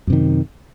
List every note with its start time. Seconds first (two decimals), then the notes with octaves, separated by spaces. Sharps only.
0.07 F#2
0.10 C3
0.13 D#3